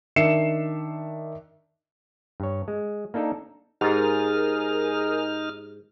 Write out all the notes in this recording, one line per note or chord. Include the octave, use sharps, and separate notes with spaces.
D#3 D4 E5 C7 C#7 E7
G2 C#5
G#3
A#3 D4 D#4 A4 A#4
G#2 D#4 G4 G#4 A#4 D#6 F6 A6